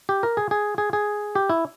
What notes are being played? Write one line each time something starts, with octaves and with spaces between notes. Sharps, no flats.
G4
A#4
G#4
G#4
G#4
G#4
G4
E4